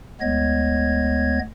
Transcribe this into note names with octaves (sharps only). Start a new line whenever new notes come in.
D2 G#3 B3 C#5 D#5 G#6